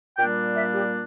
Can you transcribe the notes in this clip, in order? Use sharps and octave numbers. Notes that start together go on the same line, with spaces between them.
A#2 G3 A#3 D4 G5
E5
G4